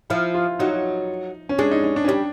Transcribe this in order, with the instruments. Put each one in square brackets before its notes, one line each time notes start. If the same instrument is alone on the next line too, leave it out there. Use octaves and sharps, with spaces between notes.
[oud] F3 [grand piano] E4
[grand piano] F4
[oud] F#3 [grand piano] D#4
[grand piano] C#4
[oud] G#3 [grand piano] D4
[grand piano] D#4
D#4
D4
C#4
[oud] G3 [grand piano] D4